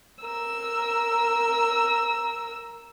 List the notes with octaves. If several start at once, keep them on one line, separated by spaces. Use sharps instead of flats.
A#4 E6